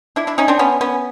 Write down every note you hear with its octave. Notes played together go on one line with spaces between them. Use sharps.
D4 E4
D4 E4
C#4 D#4
C4 D4
B3 C#4
B3 C#4